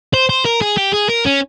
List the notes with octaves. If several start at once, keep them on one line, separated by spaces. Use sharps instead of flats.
C5
C5
A#4
G#4
G4
G#4
A#4
C#4